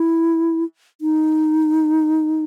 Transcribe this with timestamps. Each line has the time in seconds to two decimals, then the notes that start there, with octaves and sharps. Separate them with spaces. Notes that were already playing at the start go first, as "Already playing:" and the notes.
Already playing: E4
1.01 D#4